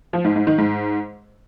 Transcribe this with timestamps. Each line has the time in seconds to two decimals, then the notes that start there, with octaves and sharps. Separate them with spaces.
0.13 F3
0.25 G#2
0.36 G#2
0.47 D#3
0.58 G#2